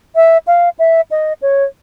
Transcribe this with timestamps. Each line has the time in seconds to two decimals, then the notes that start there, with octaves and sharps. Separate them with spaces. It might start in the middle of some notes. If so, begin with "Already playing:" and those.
0.15 E5
0.47 F5
0.79 E5
1.11 D#5
1.42 C#5